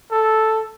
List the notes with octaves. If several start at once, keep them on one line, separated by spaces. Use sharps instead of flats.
A4